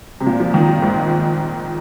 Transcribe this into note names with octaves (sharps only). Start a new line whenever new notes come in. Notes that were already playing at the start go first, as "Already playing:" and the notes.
C3
A#2
F3
D#3
F3
G#2